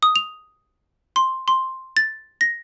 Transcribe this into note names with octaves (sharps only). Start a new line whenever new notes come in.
D#6
F7
C6
C6
A6
A#6